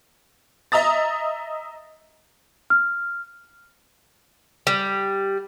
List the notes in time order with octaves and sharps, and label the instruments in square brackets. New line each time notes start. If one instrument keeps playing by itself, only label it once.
[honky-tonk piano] D#5 E5 A#5 D#6 A6
[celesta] F6
[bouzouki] G3